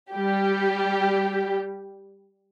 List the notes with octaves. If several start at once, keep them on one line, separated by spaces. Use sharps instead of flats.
G3 G4